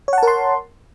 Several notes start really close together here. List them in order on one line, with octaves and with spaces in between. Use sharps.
C#5 F#5 A5 A#4 C6